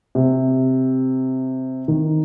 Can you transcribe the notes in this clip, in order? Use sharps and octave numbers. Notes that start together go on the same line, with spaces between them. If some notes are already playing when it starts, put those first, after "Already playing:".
C3
D#3